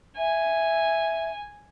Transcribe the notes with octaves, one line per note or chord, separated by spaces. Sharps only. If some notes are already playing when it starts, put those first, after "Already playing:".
E5 G#5